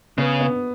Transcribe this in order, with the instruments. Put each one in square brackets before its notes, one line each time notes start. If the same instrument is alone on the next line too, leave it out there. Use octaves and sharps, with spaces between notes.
[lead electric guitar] C#3 [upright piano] B3
[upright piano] B3